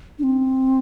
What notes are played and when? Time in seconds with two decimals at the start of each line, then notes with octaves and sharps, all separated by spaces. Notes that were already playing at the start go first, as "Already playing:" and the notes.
0.19 D4
0.23 C4